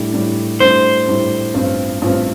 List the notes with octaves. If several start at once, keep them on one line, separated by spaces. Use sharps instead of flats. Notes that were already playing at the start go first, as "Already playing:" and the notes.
Already playing: A2 G3 D4
A2 G3 D4
A2 G3 D4 C5
A2 G3 D4
A1 G2 F3 C4 F4
A1 G2 F3 C4 F4